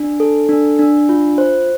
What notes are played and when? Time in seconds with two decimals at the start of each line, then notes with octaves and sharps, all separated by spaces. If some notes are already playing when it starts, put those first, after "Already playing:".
Already playing: D4
0.20 A4
0.49 D4
0.79 D4
1.09 F4
1.38 C5